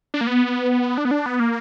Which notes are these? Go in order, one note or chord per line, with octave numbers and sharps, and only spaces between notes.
D4
A#3
B3
D4
B3
D4
B3
A#3